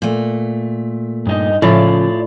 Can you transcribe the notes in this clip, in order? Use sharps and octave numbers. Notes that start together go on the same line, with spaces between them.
A#2 A3
G2 D#4 D#5
A2 C#3 F3 G#3 E4 F4 D5